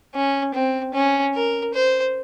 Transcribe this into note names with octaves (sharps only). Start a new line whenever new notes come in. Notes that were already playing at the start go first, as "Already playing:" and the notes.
C#4
C4
C#4
A#4
C5